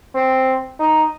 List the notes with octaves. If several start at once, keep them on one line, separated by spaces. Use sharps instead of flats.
C4
D#4